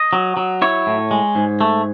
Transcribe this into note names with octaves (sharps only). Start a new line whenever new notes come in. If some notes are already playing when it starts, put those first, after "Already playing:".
Already playing: D#5
F#3
F#3
E4 C#5
A2
G#3
G#2
A3